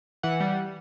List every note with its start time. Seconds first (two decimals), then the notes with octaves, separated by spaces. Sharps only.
0.23 E3 F#5
0.40 G3